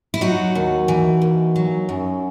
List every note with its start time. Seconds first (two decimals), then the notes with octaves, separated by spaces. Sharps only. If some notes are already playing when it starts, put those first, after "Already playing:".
0.14 E4
0.21 F#3 D#4 F#4
0.55 D#2
0.88 E3
1.22 D#2
1.56 F#3
1.89 F#2